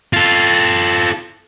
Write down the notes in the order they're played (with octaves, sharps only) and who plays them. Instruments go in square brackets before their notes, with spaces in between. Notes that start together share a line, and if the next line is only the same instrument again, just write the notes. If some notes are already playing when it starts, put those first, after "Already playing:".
[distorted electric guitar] F4 A4